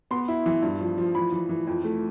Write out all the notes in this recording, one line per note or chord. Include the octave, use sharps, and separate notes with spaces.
B3 C6
E4
E3
G2
F3
F3
E3 B5
E3
E3
F2
A3